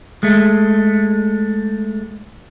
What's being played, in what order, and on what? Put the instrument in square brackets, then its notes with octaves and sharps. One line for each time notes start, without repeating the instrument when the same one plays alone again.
[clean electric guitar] G#3 A3